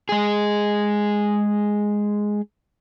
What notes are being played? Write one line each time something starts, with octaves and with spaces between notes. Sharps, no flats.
G#3 G#4